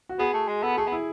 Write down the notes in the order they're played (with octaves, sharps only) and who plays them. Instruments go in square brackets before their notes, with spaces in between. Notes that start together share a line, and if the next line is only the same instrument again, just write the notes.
[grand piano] F#4
[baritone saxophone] B3 [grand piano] G#4
[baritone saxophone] A3
G#3
[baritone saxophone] B3 [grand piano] A4
[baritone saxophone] A3 [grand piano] G#4
[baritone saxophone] B3
[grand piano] E4